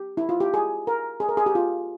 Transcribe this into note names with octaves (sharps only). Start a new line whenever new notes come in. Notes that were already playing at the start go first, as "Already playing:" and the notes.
Already playing: G4
E4
F4
G4
G#4
A#4
G#4
A#4
G#4
G4
F4